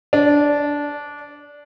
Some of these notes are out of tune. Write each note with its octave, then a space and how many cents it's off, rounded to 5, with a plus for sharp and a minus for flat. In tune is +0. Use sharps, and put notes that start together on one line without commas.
D4 -15